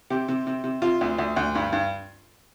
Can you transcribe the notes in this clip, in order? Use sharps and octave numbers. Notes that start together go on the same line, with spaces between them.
C3 G4
C3
C3
C3
C3 F4
D2
D2
D2
G2
G2